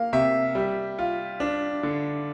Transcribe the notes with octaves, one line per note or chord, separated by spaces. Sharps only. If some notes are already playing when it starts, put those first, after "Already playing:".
Already playing: A#3 F5
C3 E5
G3
F4
D4
D3